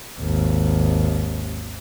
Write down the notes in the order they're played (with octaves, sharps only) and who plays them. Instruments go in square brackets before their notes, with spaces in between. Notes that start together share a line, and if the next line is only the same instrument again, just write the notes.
[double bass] G#1 D#2